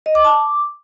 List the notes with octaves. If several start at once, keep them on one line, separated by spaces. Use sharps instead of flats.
D#5
D6
A5
D6